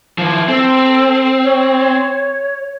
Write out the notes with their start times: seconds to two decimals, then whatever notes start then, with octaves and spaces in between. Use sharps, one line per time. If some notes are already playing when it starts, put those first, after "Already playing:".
0.18 F3 E4
0.48 C4 A4
1.44 C#5